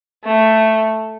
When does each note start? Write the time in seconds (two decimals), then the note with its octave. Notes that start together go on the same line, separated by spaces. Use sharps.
0.24 A3